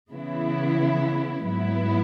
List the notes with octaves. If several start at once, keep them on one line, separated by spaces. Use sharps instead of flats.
C#3 E3 B3 E4
G#2 F#3 B3 E4